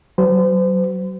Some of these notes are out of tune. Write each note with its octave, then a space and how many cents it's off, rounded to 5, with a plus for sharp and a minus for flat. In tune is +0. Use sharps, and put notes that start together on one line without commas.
F#3 +30 C5 -40